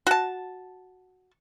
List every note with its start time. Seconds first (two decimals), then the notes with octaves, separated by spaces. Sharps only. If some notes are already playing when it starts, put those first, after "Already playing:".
0.07 F#4 A5